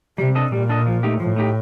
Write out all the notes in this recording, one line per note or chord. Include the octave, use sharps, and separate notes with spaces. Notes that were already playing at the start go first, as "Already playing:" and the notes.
C3 G3
D4 A4 D#5
A#2 G3
D4 A4 D#5
F3
A3 D#4 G4
A2 F3
A3 D#4 G4